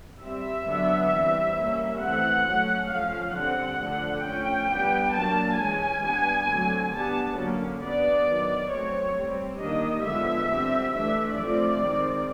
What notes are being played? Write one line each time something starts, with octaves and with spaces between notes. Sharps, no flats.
G3 C4 E5
D3 F#3 B3 D4
E3 G3 C4
G3 A#3 C#4
E3 A3 C4 F#5
F#3 A3 C#4
F3 A3 C#4 F5
D3 G3 C4 F#5
D3 F3 A3 D4
F3 A3 C#4 G5
G3 B3 D4
F#3 A#3 D4 A5
E3 G#3 C#4 G#5
G3 B3 D4
D3 F#3 A3 C4
G3 B3 D4 A5
D3 F#3 A#3 C#4
G3 B3 D4 D5
D#3 F#3 B3
F#3 A3 C4 C#5
G3 C4
D#3 G3 A#3 D4 D#5
D3 F3 G#3 B3 E5
D3 G3 C4
E3 A3 D4 E5
F3 A3 C4 D5
D#3 G#3 C4